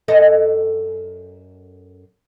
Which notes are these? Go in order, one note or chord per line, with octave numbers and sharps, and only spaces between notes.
F#2 A4 D#5